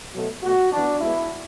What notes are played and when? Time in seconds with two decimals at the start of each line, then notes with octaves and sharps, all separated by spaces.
0.15 B2 F#3 A3
0.42 B2 A3 F#4
0.71 F#2 E3 B3 D4
1.01 A2 G#3 B3 E4